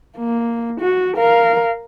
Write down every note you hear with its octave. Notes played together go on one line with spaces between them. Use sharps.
A#3
F#4
A#4 F5